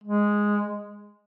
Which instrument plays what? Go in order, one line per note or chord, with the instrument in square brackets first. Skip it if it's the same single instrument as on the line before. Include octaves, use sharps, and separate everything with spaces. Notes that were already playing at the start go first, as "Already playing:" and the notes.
[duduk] G#3